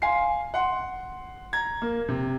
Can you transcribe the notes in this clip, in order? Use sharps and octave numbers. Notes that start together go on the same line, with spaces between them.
F5 G#5 C6 C7
F#5 C6
A#5 G#6
A#3
C3